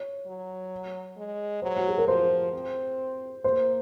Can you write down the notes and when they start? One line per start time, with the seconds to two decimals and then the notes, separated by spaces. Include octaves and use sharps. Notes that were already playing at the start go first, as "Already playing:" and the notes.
Already playing: C#5
0.26 F#3
1.17 G#3
1.62 F#3 C5
1.76 F#4
1.88 G#4
1.98 A#4
2.07 F3 C5
2.53 C4
3.44 A#3 C5